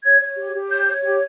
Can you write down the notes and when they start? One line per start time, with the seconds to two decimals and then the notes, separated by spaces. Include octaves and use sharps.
0.03 C#5 G#6
0.20 C#5
0.36 G4
0.52 G4
0.69 C#5 G6
0.86 C#5
1.03 G4